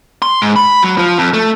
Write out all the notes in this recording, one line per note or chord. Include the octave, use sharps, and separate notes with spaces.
C6
G#2
B5
F#3
F3
F2
A3